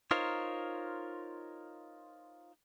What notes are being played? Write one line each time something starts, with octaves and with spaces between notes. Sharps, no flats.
D#4 F4 A#4 C5 C#5